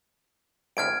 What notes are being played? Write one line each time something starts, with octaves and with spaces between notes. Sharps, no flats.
G#1 D2 A2 F6 G#6 D7